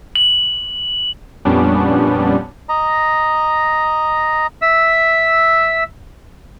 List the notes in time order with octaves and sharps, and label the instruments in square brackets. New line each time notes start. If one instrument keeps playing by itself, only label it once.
[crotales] F#7
[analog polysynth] F2 A#2 G3 B3 C#4 D4
[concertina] D#5 A#5
E5 E6